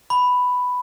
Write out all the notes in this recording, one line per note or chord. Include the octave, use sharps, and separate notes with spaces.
B5